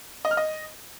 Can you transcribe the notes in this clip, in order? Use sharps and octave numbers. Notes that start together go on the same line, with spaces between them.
D#5
F6
D#5